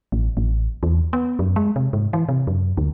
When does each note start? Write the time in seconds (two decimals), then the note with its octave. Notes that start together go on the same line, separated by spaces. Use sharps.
0.12 A1
0.37 A1
0.83 E2
1.13 B3
1.39 F#2
1.56 G#3
1.76 C3
1.93 G#2
2.13 E3
2.29 C3
2.47 F#2
2.77 D2